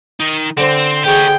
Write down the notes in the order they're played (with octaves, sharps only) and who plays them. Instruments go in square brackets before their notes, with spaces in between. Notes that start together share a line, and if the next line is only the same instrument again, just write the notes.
[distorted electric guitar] D#3 D#4
[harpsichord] D3 C5 [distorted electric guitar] C4
[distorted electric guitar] G4 C#5 [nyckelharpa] G#4 G5